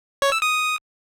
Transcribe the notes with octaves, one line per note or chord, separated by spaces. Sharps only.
C#5
E6
D#6